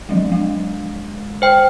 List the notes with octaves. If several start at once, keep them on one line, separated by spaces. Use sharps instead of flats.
F3 F#3 G#3
G#3
C5 G5